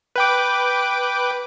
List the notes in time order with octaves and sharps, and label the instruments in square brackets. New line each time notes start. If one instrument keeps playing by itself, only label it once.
[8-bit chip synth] B4 G5 D6